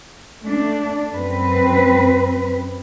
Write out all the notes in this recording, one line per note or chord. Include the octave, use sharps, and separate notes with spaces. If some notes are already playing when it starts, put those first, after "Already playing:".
A3 D4
F#2 C4 B4